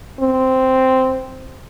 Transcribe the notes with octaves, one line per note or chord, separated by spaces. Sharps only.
C4